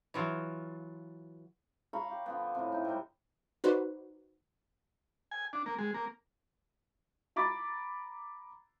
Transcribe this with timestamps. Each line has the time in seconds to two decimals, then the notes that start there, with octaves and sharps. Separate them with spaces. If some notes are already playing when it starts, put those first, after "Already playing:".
0.14 E3 F#3 F4
1.93 F5 A#5 B5 C#6
2.10 G4
2.26 D3 F3 B3
2.55 A2 C3
2.72 D#4 E4
2.85 C3 G3
3.64 D#4 F#4 B4 C5 D5
5.31 G#5
5.53 D4
5.66 A#3
5.79 G#3
5.94 A#3
7.36 A#5 B5 D6 A6